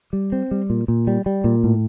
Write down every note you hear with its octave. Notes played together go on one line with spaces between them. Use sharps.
G3
C4
G3
A#2
A#2
G3
G3
A#2
A2